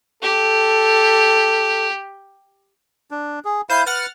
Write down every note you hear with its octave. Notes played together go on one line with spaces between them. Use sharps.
G4 A4
D4
G#4
E4 C5 F5 G6 D#7
B4 F#5 F6 A6